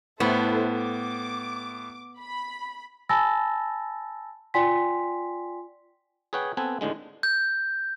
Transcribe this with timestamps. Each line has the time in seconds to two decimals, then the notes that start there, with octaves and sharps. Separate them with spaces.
0.20 A2 B3 E4 A4 C5
0.77 D6
2.20 B5
3.09 G#5 A5 B5 E6 A6 A#6
4.54 F4 D5 G5 G#5 C6 B6
6.33 G#4 B4 C#5 F#5 G5
6.57 B3 C4 A4 B4 G#5
6.81 D#2 A2 D3 G#3
7.23 G6